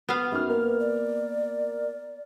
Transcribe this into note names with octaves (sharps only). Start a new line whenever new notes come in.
B3 F5
F#2 D#4 F6
A#3 B4
D5